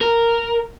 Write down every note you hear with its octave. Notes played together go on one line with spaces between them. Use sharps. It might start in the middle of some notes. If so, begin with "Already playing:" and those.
A#4